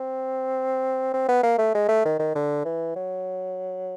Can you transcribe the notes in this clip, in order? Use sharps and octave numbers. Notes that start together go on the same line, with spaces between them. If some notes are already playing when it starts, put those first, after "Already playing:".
Already playing: C4
C4
B3
A#3
A3
G#3
A3
D#3
D#3
D3
E3
F#3